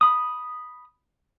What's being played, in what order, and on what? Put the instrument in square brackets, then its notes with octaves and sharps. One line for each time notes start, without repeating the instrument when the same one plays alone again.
[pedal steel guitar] B5 D#6